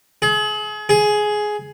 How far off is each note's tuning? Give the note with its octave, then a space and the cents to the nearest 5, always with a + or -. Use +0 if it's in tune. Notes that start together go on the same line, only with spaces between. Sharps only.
G#4 +35
G#4 +10